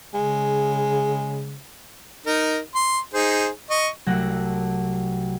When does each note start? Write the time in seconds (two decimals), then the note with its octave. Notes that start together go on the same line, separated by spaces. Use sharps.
0.14 C#3 G#3
2.26 D#4 A#4
2.75 C6
3.14 D#4 G#4 C5
3.70 D#5 C#6
4.06 C2 F#3 A3 F#5 E6 A#6